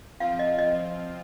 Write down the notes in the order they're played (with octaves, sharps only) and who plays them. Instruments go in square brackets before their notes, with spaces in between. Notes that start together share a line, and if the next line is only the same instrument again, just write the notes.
[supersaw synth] F3 C4 F4 [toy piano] F5
[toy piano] D#5
D#5